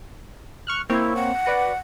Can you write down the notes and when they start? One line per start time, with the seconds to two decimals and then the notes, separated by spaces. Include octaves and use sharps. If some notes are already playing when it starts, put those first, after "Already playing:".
0.67 C#6 F6 F#6
0.89 A#3 C4 E4 C#5
1.16 F#5
1.46 F#4 B4 D5